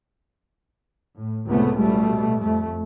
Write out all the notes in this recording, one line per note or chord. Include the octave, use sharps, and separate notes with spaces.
A2
C#2 A2 C3 A3 B3
B2 G3 A3
F2 A3